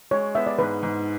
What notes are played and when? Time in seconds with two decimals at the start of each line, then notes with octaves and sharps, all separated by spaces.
0.11 G#3 C#5
0.35 B3 E5
0.47 D5
0.59 G#2 B4
0.83 G#2